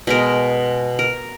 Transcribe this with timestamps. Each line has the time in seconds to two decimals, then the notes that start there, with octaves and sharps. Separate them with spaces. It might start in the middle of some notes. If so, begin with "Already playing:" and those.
0.07 B2 G#3 A#4
0.99 A#4